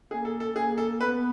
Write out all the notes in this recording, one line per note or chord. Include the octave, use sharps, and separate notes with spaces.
A#3 G#4
A4
A4
A#3 G#4
A4
B3 B4